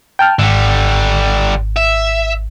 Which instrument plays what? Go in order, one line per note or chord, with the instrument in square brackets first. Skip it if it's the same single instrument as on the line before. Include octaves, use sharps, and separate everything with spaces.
[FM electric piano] G5 A5 F6
[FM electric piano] G#1 [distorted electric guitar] D3 G3
[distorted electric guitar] E5